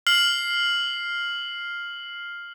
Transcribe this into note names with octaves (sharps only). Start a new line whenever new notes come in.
F6 C7 F#7